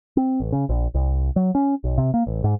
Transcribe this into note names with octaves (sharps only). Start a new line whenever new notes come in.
C4
A1
C#3
A#1
C2
F#3
C#4
B1
C3
A#3
A1
G#2